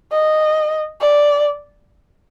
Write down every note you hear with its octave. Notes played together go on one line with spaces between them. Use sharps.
D#5
D5